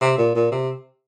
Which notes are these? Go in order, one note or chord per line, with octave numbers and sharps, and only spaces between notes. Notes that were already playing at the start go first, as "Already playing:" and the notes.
C3
A#2
A#2
C3